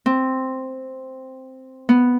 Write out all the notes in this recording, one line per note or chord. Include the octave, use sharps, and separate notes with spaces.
C4
B3